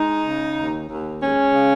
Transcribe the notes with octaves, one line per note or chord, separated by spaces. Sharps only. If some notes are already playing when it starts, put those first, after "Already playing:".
Already playing: G#3 D#4
C#3
D#2
D#2
G#3 C#4
C#3